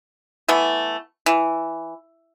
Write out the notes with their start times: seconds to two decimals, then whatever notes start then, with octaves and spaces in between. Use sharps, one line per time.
0.48 E3 A3 B3
1.26 E3